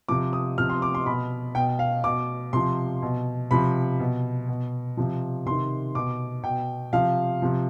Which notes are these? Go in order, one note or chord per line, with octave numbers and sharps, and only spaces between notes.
C3 F3 D6
D#6
C3 F3 F6
C6
D6
C6
B2 B5
B2 G5
F5
B2 D6
C3 F3 C6
B2
C3 F3 B5
B2
B2
C3 F3
C3 D#3 C6
B2 D6
B2 G5
C3 F3 F5
C3 F3